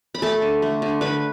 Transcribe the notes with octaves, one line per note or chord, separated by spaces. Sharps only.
B5
A3 A4 A5
D3
A3
D3
D3 B4 B5